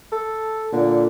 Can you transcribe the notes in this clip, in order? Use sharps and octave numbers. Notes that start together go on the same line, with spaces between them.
A4
A#2 D3